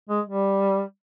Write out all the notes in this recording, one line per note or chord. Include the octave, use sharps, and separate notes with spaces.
G#3
G3